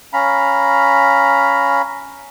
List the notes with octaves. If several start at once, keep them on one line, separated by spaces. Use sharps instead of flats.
C#4 F5 A#5 B5